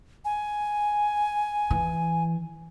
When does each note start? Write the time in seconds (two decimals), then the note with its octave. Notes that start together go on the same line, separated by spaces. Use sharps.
0.25 G#5
1.70 E3